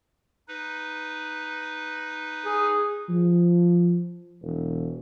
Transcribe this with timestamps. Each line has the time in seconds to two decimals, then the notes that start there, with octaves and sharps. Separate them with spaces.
0.48 D#4 B4
2.46 G#4
3.09 F3
4.42 E1